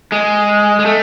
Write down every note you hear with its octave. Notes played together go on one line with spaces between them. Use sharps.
G#3
G#3
A3